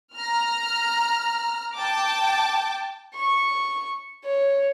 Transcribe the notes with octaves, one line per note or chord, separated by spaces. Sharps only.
A#5 F6
G5 A5 D6
C#6
C#5